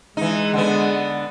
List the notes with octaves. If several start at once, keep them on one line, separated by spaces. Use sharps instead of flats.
E3 G#3 D#4
D3 B3